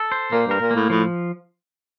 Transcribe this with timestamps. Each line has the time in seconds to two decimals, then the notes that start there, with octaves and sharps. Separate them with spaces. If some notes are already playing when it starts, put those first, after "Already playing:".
Already playing: A4
0.12 C5
0.32 A#2 A#3
0.47 G2 A#4
0.61 A#2
0.71 A2 A#3
0.90 A2 F3